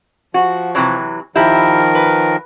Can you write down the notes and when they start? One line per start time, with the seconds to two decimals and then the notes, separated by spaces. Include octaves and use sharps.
0.34 F3 F#4
0.75 C3 E3 F#3
1.36 D#3 F3 E4 G4 A#4 E5
1.95 B4